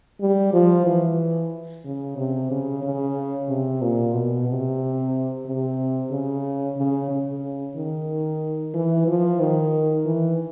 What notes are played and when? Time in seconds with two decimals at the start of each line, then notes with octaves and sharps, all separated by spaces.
0.21 G3
0.53 F3
0.86 E3
1.85 C#3
2.17 C3
2.51 C#3
2.83 C#3
3.49 C3
3.82 A#2
4.14 B2
4.48 C3
5.46 C3
6.11 C#3
6.77 C#3
7.11 C#3
7.76 D#3
8.74 E3
9.07 F3
9.40 D#3
10.06 E3